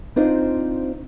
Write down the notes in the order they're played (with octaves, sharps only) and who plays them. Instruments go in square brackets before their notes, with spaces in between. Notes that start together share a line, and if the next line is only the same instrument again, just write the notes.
[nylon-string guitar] C4 D4 D#4 F4 C5